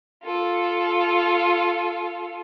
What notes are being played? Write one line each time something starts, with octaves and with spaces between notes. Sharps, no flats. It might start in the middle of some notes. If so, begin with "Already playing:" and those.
F4 A4